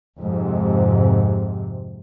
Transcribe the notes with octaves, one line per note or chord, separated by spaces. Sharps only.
F2 G#2 C3